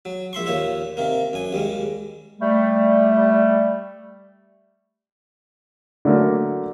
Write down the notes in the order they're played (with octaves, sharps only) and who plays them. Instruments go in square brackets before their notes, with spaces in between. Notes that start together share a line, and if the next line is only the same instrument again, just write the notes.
[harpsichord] F#3
A#1 E5 C6 C#6
D#2 A#2 C#5 E5
C3 D#3 A#3
F#2 G#5
D#2 G3 G#3
[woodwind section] G3 A3
[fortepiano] D3 F#3 A3 A#3